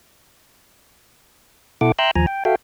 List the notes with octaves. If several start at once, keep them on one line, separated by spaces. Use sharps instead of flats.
B2 E4 A4 F#5 D6
E5 G5 A#5 C6 E6 F#6
D#2 F3 G#5 A#5
G5
F#4 A4 E5 F5 G5